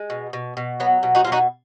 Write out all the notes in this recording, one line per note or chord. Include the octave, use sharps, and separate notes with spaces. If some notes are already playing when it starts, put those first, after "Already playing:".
Already playing: G#3
B2
B2
B2
F#3 B3
B2
D#4 F#4
B2 F4
D#4 F#4